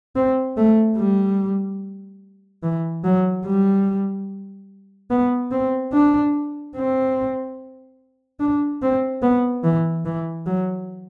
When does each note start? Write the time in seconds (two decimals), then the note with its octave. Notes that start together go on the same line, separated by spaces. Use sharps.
0.16 C4
0.57 A3
0.98 G3
2.63 E3
3.04 F#3
3.45 G3
5.10 B3
5.51 C4
5.93 D4
6.76 C4
8.40 D4
8.82 C4
9.23 B3
9.64 E3
10.05 E3
10.46 F#3